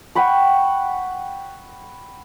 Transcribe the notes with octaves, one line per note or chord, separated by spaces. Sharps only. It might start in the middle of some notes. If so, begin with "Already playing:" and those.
F#5 G5 B5 C#6